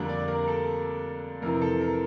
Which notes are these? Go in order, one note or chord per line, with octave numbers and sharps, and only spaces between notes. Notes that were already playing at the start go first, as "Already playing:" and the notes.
Already playing: F2 D3 G3 A#3 D4 A#5
D5
A#4
A#4
A4
F2 C3 E3 A#4
A4
A#4